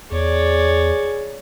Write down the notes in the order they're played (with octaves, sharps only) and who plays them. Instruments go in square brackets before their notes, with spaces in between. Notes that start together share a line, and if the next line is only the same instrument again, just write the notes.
[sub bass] E2 [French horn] G#4 [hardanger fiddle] C#5 D5